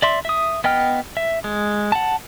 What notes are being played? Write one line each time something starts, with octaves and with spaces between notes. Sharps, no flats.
D5 E5 C6
E5 D#6
B3 D#5 G5 F6
E5
G#3
F#5 A5